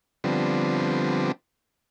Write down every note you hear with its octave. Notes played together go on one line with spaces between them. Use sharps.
D3 F3 G3 B3 C4